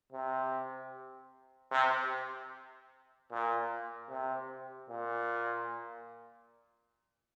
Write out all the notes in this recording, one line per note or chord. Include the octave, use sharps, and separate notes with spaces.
C3
C3
A#2
C3
A#2